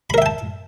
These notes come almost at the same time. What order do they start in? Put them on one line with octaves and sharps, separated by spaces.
B5 A#4 E5 G5 A5